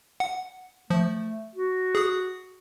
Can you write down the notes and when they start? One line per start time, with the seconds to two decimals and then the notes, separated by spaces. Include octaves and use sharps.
0.20 F#5
0.90 F3 A3
1.55 F#4
1.95 G#4 D#6